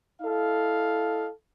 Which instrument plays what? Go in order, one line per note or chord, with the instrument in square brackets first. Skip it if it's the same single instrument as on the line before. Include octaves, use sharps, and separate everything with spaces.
[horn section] E4 A4 D#5 F5